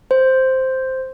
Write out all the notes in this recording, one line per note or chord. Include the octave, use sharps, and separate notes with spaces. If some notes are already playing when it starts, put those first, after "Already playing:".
C5